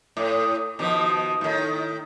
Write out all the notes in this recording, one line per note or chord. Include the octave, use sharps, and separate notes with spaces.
A2
B2 D#3 F3
A2 D#3